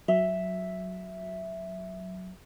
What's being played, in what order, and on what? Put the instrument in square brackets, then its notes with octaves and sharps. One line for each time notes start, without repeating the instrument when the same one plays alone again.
[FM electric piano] F#3 [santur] E5